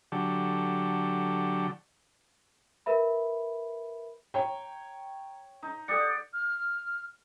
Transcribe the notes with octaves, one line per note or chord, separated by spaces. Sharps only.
D3 F#3 G4 A4
A#4 B4 E5 B5
C#5 G5 A#5
D#4 A#5
G4 A4 D5 F#5 D#6 C#7
F6